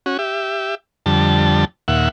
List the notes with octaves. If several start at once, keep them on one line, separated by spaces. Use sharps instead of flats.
C#4 F#4
G4 E5
F2 D3 G3 A5
D#2 A#2 E5 F#5